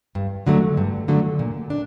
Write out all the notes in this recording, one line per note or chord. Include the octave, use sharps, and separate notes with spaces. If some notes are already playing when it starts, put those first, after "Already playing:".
G2
D3 F#3 A3
G2
D3 F#3 A3
A#2
D4